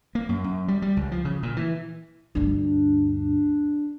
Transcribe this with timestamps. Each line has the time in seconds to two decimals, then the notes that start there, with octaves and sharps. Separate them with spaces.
0.15 A#3
0.29 F#2
0.44 F#2
0.68 G3
0.82 G3
0.97 C#2
1.12 F3
1.25 C#3
1.43 A#2
1.57 E3
2.35 D2 G2 D4